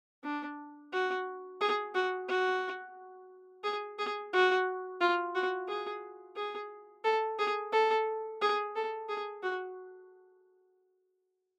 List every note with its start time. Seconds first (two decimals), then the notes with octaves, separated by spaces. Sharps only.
0.24 D4
0.93 F#4
1.61 G#4
1.94 F#4
2.28 F#4
3.64 G#4
3.99 G#4
4.33 F#4
5.00 F4
5.35 F#4
5.68 G#4
6.36 G#4
7.04 A4
7.39 G#4
7.72 A4
8.41 G#4
8.76 A4
9.09 G#4
9.43 F#4